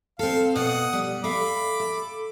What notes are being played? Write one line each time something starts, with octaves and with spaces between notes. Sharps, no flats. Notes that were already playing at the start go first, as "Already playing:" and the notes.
C4 A4 F5
B2 F#5 D#6
G3
A4 E5 F5 B5 D6
A4